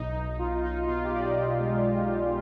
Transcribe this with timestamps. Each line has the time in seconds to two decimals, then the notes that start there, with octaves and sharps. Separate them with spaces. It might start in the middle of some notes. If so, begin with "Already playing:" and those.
Already playing: B1 D#4
0.15 B1
0.39 B1 F4
0.63 B1 D#4
0.87 B2 F4
1.04 G4
1.11 B1 D5
1.19 D#5
1.35 B1 D5
1.60 G#3